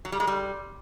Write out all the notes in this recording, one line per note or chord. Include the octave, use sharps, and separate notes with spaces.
F#3
G3
G#3
G3